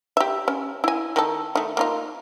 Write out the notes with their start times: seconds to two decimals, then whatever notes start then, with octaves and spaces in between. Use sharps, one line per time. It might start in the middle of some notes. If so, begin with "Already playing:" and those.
0.17 G4 E5
0.48 C#4
0.84 E4 G#5
1.16 D#3 A4
1.55 D#3 A3
1.77 A#3 D#4 F4